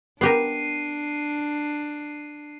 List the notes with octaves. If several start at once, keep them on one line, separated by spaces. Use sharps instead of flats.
B3 D4 G4 A#4 C7 D#7